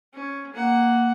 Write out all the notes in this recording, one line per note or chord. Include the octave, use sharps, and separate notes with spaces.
C#4
A#3 F#5